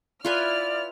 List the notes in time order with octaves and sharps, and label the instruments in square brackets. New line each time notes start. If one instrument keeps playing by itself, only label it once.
[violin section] E4 F6 [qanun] F4 B4 G#5 [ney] D5